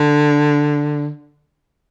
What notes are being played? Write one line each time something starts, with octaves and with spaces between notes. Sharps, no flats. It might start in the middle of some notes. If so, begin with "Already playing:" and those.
Already playing: D3